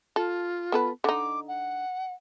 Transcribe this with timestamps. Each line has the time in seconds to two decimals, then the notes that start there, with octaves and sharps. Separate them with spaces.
0.16 F4 A4
0.72 B3 A4 B4
1.04 D3 D#4 D6
1.48 F#5